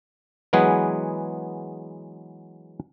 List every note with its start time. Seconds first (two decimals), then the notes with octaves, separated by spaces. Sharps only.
0.53 E3 F#3 G#3 B3 G#4 B4